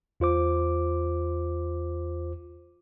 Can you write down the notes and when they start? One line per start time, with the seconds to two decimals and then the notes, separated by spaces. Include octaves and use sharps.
0.20 E2 F4 C5 D6